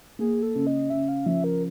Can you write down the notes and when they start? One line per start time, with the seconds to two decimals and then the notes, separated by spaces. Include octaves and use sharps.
0.19 A#3 G#4
0.42 A4
0.55 C#3
0.67 D#5
0.90 C#3 E5
1.09 F5
1.26 F3 E5
1.44 A#4